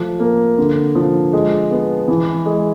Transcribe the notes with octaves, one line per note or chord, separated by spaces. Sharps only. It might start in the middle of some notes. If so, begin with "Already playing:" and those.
Already playing: F3 A3
A#3
D3
F3
G#3
B3
E3
G#3